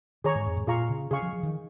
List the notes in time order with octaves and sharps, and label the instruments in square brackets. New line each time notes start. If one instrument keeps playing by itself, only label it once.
[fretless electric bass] D#3 [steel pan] G#4 C#5 A#5 C#6
[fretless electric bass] G#2
F2
G#2
[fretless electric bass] A#2 [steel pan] F4 G#4 F5 A#5 C#6
[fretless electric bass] C#3
[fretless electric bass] C#3 [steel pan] G#4 F5 C#6
[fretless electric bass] F3
F3
D#3